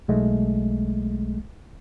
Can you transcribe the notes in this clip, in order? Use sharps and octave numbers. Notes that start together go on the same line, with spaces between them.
B1 G#3 A3